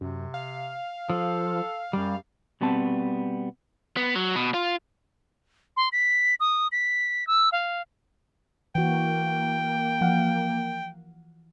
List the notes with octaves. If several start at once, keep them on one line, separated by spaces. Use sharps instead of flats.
F#2 C3
F5
F3 A4
F#2 G3
B2 G3 B3 C4 A5
B3
F#3
B2
F4
C6
B6
D#6
B6
E6
F5
E3 A#3 F#4 G5
F3 F5 F#5